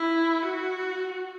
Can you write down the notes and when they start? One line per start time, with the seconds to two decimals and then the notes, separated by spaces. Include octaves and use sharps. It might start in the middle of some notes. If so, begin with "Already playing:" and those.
Already playing: E4
0.42 F#4